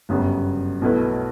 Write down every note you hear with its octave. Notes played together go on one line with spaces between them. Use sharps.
G1 F#2 C#3 G3 B3
B1 B2 A3 E4 B4